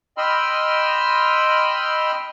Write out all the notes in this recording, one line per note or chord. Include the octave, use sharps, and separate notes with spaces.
D#5 G5 B5 C6 E6 F6